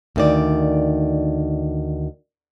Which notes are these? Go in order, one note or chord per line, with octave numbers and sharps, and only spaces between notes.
D2 D#3 D5